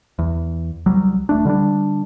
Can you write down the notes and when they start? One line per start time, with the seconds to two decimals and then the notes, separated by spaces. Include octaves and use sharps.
0.19 E2
0.86 C2 F#3 G3
1.29 D#1 A3 D4
1.45 D3 G3 A3 D4